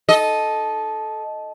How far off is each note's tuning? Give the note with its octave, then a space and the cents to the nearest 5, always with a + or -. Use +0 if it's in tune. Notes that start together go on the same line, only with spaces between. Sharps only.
A4 -15 D#5 +0